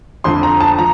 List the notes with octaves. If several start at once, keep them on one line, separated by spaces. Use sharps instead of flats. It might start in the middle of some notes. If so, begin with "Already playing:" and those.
F2 D3 F3 C6
A#5
A5
F3 A#5